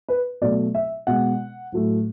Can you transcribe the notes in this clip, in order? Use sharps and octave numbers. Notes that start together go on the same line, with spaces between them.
B4
B2 F#3 A3 D5
E5
B2 G#3 F#5
A2 F#3 A3